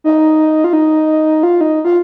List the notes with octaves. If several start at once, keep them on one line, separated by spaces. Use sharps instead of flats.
D#4
F4
D#4
F4
D#4
F4